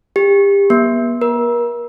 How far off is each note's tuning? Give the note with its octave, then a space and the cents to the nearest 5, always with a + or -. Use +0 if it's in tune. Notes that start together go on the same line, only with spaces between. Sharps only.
G4 +30
A#3 +45
A#4 +35